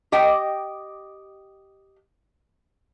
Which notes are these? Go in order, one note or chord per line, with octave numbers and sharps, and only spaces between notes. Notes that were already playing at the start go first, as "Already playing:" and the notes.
G4 D#5 G5